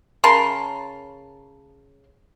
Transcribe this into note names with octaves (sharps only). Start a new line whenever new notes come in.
C#3 A#4 A5 C6